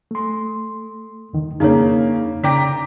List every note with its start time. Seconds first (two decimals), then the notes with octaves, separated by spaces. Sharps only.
0.11 A3 C6
1.33 D#2 D#3
1.60 F2 C#3 A#3 D4 D#4 C#5
2.44 C#3 D5 G5 A#5 D6 B6